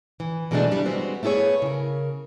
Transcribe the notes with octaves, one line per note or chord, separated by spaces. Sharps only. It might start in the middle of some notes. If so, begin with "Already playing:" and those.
E3
B2 E3 F3 G#3 A3 D4
G3 D4 E4
G#3 B3 C4 F#4
A3 B3 E4 G#4 C#5
C#3 A#4